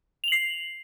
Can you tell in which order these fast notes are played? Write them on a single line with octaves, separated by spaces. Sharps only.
F7 F#7 C7